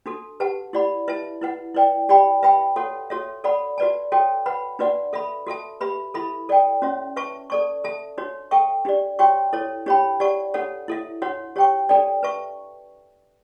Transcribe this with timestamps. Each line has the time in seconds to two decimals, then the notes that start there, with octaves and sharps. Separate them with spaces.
0.06 D4 F#4 A4
0.40 G4 B4 F#5 A5
0.73 E4 G4 D5 F#5 B5
1.08 E4 B4 E5 A5
1.42 E4 B4 F#5
1.75 E4 B4 D5 G5
2.09 G4 D5 G5 B5
2.43 B4 E5 G5 B5
2.76 F#4 A4 C#5 F#5
3.10 F#4 A4 C#5 E5
3.44 A4 D5 F#5 B5
3.78 F#4 B4 D5 A5
4.12 F#4 A4 C#5 G5
4.46 B4 F#5 B5
4.79 D4 F#4 B4 D5 F#5
5.13 A4 E5 B5
5.47 F#4 A4 E5 A5
5.81 G4 B4 E5 B5
6.14 E4 A4 E5 B5
6.49 A4 D5 G5
6.82 C#4 F#4 C#5 E5
7.16 B4 E5 A5 C#6
7.50 A4 D5 A5 C#6
7.84 A4 E5 A5
8.18 D4 F#4 C#5
8.51 A4 E5 G5 C#6
8.85 D4 G4 D5
9.19 F#4 C#5 G5 C#6
9.53 E4 A4 C#5
9.86 D4 G4 C#5 G5 B5
10.20 G4 D5 F#5 A5 C#6
10.54 D4 A4 C#5 F#5
10.88 E4 A4 E5
11.22 D4 F#4 C#5 F#5
11.56 G4 C#5 G5 C#6
11.89 D4 A4 D5 G5
12.23 B4 E5 A5 C#6